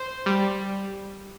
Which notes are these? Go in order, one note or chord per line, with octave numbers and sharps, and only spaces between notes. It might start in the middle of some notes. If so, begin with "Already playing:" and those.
Already playing: C5
G3